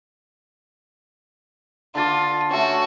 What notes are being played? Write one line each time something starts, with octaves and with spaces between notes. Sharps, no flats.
D3 F4 A5 D6
A3 C#4 F#4